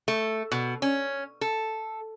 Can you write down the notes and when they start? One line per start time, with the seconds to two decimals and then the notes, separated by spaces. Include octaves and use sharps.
0.08 A3
0.52 B2
0.82 C#4
1.41 A4